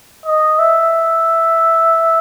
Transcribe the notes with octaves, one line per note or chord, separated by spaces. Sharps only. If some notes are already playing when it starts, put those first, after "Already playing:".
D#5
E5